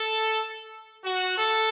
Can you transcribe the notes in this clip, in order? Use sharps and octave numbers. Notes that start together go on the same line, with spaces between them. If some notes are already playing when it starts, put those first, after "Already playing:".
Already playing: A4
F#4
A4